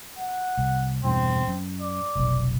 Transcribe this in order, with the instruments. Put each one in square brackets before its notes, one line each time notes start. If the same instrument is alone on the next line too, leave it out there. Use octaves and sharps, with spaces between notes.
[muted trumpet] F#5
[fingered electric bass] C2
[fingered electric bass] E2 G2 B2 [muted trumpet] C4
[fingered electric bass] F#2
[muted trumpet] D5
[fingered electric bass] F1 B1